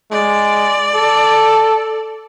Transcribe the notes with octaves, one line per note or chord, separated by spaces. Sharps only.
G#3 D5
A4